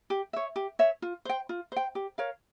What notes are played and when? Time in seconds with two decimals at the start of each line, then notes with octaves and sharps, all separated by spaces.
0.10 G4
0.33 C#5 E5
0.56 G4
0.79 C#5 E5
1.02 F4
1.25 C5 G5
1.49 F4
1.72 C5 G5
1.95 G4
2.18 A#4 C#5 F5